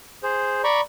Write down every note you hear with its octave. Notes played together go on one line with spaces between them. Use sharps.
G#4 C5
D5 A#5 B5 C#6